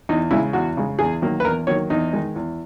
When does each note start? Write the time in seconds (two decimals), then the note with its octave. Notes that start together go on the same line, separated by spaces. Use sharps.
0.09 E2 D#4
0.31 C#3 G#3 E4
0.53 E2 F#4
0.77 C#3 G#3
0.99 E2 G#4
1.22 D#3 F#3 A#3
1.40 B4
1.45 E2 A#4
1.67 D#3 F#3 A#3 C#5
1.90 E2 D#4
2.13 D#3 G#3
2.36 E2